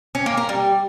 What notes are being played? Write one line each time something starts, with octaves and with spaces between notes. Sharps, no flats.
C#4
A#3
A#4
G3